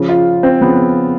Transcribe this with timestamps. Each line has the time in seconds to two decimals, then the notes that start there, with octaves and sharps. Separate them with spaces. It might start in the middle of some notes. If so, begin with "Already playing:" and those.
Already playing: C#3 F3
0.09 F4
0.43 C4
0.61 C#3 F3 B3